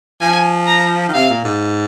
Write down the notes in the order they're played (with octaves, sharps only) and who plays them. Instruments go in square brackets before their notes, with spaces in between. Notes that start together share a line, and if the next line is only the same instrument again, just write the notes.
[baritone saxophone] F3 [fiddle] G#5
[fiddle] A#5
[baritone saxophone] D#3
[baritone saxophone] C3 [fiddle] F5
[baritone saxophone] A#2
G#2